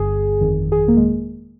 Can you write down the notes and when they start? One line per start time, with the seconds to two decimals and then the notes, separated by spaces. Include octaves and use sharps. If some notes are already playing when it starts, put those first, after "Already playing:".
Already playing: G1 G2 D3 G#4
0.40 G1 F2 D#3
0.72 G#4
0.88 A#3
0.97 G#3